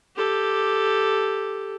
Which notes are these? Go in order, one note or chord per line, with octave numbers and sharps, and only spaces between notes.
G4 A4